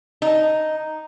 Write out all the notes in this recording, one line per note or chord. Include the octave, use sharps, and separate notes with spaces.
D#4